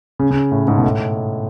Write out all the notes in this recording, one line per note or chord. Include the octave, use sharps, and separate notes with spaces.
C#3
C#3
A2
G#2
B2
A2